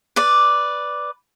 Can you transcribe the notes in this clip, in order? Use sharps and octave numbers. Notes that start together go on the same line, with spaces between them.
B4 D5